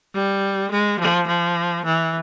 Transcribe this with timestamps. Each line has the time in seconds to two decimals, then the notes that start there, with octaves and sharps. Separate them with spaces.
0.14 G3
0.70 G#3
0.99 F3
1.27 F3
1.85 E3